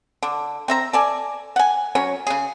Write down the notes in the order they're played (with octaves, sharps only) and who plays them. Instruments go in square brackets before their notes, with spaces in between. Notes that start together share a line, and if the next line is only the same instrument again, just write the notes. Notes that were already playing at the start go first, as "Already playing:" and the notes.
[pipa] D3
C4 E5 A#5
A4 D5 G#5
F#5 G#5
F#3 C#4 C#5
C#3 G#4